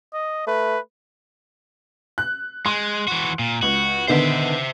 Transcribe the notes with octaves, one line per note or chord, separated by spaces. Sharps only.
D#5
A3 B4
F#6
G#3 C6
E3 F#4
A#2
C#2 F#4
D3 D#3 B3 C5 E5